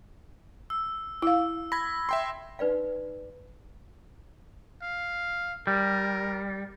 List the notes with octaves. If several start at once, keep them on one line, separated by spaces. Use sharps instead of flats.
E6
E4 F5 E6
B5 G#6 A#6
E5 G5 C6
D#4 B4 D5 F5
F5
G3 A#4